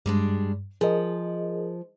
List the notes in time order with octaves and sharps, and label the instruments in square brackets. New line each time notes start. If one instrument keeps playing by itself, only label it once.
[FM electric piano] G2 [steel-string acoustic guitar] G3 G#3 D4
[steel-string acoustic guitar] F3 [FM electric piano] G#4 A#4 D#5